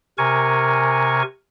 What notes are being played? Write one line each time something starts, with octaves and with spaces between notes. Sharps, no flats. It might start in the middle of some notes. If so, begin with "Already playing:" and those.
C3 A#4 G#5 C#6